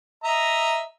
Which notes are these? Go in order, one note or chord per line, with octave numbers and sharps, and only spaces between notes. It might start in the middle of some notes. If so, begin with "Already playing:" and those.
D#5 E5 A#5